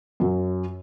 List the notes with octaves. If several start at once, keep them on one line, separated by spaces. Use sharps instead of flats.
F#2 F#3